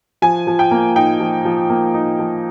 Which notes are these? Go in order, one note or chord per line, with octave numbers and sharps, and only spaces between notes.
F3 G#5
F3
G5
A#3
D#4 G5
F3
F3
A#3
D#4
F3